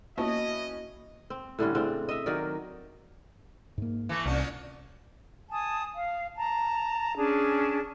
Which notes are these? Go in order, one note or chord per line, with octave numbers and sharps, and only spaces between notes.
A#3 B3 C#4 E4 F#4 D#5 A5
C4
A2 D3 G3 C#4
A2 C#3 C4 D4
D#5 E5
D#3 F#3 A#4 D5
G#2 A#3
E3 A3
C2 A#2 C#4 D4
G#5 A5 D#6
F5
A5 A#5
C#4 D4 G#4 A5